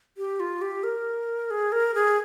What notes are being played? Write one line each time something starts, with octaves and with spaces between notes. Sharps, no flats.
G4
F4
G4
A#4
G#4
A#4
G#4